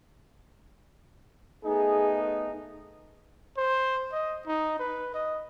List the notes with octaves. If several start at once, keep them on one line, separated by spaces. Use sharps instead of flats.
A3 B3 D#4 G#4
C5
D#5
D#4
B4
D#5